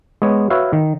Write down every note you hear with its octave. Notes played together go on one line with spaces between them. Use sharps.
G#3 B3 C#5
F#4 B4 C#5 E5 F5
D#3